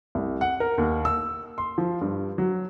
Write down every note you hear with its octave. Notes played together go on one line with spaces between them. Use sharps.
C2
F#5
A#4
D#2
E6
C6
F3
G2
F#3